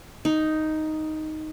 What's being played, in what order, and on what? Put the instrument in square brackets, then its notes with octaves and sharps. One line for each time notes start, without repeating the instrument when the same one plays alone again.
[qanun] D#4